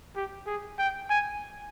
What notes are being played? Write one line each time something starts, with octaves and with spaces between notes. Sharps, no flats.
G4
G#4
G5
G#5